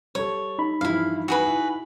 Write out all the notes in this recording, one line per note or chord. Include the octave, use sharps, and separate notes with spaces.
G3 A4 C#5
D#4 B5
G2 E3 F3 E4 F5
F#4 G#4 B4
E4